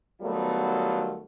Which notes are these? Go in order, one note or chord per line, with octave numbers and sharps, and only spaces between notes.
D#3 F#3 G3 A3 B3 F4